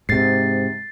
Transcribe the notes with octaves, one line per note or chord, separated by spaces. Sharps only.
G#2 C3 A6 C7